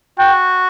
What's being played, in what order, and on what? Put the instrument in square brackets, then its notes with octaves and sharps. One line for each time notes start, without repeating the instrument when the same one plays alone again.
[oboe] F#4 [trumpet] G5